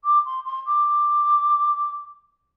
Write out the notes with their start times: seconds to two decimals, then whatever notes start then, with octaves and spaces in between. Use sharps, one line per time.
0.04 D6
0.25 C6
0.45 C6
0.66 D6